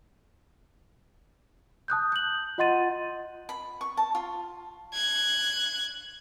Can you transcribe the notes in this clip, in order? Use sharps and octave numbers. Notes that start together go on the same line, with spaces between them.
A5 D#6 F#6 G6
G6 F#7
F4 D#5 F#5 C6 A6 D#7
B5
C#6
A5
F4
F#6 G#6